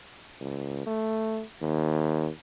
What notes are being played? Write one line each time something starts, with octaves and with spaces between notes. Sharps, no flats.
C#2
A3
D#2